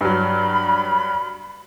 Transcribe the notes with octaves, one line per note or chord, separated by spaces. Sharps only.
G2 F#3 B5